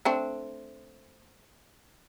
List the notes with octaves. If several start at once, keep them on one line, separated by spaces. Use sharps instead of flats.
A3 C4 D4